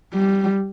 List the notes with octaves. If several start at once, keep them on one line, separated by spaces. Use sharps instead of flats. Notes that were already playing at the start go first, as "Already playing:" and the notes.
G3